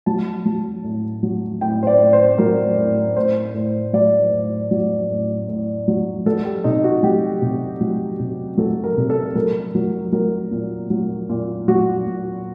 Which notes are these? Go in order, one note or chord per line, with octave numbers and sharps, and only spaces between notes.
F#3 A5
F#3
A2
F#3
A2 G5
C5
D5
A2
C5
F#3 A#4
A2
A2 C5
A2
F#3 D5
A2
F#3
A2
A2
F#3
F#3 A4
G4
C3 D#4
F#4
F#3 G4
C3
F#3
C3
F#3 A4
A#4
C3
A4
F#3 A#4
F#3
F#3 A#4
A#2
F#3
A#2
F#3 F#4
A#2